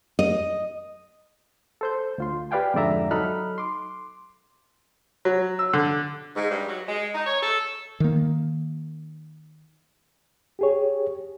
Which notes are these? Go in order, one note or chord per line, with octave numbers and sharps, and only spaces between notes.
D#5
A4 C5 G6
D2 F4 C6
G4 B4 D5 F5 G5 G#5
F2 G#2 D3 D5 E5 A#5
F#3 D#4 A4 B5 F6 F#6
C6 D6
F#3
E6
D3
G#2
G2
F#3
G#3
D#4
C#5
A4
D#3 A#3
G4 G#4 C#5